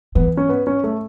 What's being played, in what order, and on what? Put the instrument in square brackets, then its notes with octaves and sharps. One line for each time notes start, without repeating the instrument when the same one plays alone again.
[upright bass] E3 [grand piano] B3
[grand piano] C#4
B3
C#4
A3